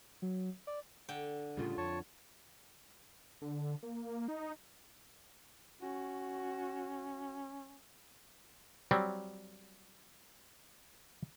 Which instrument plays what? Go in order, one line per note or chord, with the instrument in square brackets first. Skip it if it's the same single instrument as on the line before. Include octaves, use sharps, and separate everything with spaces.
[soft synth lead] F#3
D5
[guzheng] D3 G5
[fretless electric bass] A2 C#3 G3 [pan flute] F4
[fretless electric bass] F2 [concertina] C#5 A5
[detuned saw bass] D3
A#3
D#4
[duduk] C#4 [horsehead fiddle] F#4
[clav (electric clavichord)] F#3 G3 C4